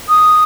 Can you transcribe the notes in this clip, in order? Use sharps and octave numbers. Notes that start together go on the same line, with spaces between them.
D#6